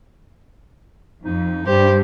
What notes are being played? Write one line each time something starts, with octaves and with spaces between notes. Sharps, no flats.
F2 D#4
G2 G4 C5